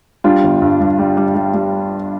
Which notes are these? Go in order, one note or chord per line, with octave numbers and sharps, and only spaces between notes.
G3 D4 F4
G1
G2
G2
G3
G3
G3
G3